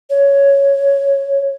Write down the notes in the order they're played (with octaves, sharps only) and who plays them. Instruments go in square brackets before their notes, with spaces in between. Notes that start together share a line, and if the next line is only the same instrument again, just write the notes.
[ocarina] C#5